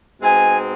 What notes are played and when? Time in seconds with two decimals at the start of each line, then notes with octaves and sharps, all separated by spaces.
0.22 B2 G#3 C4 D#4 G#5